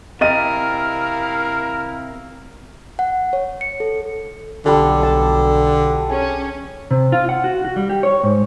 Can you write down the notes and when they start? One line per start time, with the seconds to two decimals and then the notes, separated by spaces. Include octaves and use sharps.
0.21 C3 E4 A#4 D#5 F5 A6 D#7
2.99 F#5
3.33 C#5
3.61 C#7
3.80 A4
4.66 B1 D3 G3 A4
5.03 A5
6.10 C#4 G#4
6.91 C3
7.12 F4
7.29 F#5
7.44 F#4
7.65 F#4
7.76 G3
7.89 G4
8.03 C#5
8.23 G#2